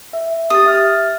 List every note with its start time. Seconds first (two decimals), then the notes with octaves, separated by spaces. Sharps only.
0.13 E5
0.50 G4 D#6 A6
0.66 E5 F6 A6